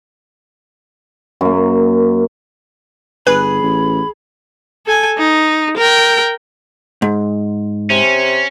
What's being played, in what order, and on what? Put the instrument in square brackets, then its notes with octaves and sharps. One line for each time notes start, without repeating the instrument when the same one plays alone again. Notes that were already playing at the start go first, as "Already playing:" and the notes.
[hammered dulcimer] F#2 A#3
[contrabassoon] G1 [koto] G#4 [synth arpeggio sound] B4 [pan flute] B5
[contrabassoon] A1
[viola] A4 G#5
D#4
A#4 G5
[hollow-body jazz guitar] G#2
[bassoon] C3 [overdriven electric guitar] C#4